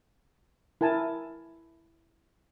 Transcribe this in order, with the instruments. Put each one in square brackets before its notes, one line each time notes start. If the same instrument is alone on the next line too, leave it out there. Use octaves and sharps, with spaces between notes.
[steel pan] E4 A#4 G#5 A5